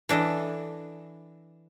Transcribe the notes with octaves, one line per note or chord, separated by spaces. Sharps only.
E3 D4 A4 D#5